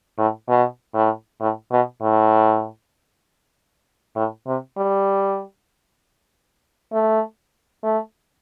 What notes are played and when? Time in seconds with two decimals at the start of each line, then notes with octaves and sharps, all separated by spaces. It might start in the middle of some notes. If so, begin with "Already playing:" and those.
0.18 A2
0.49 B2
0.94 A2
1.40 A2
1.71 B2
2.02 A2
4.16 A2
4.47 C3
4.78 G3
6.93 A3
7.84 A3